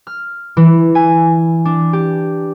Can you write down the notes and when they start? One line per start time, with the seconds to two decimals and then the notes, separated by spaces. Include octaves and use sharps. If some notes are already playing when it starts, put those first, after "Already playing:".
0.07 F6
0.57 E3
0.95 G#5
1.65 D4
1.93 G4